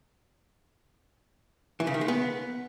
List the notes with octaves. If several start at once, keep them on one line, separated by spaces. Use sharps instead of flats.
E3
C#3
D#3
G#3
B3